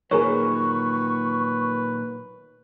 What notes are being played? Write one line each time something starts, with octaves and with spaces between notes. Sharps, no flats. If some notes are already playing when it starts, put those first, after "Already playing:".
A#2 D#3 F#3 G#4 A#4 B4 C#5 C#6